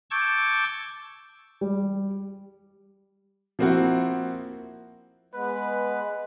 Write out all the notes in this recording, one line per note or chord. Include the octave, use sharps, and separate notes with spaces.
A5 C#6 D6 E6 G6 G#6
G3
F3 A#3 C4 E4 F#4
G#3 B3 B4